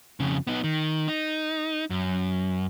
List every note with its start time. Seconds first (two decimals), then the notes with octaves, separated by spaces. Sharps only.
0.20 F2 C#3
0.47 B3 D#4
0.64 D#3
1.08 D#4
1.90 F#2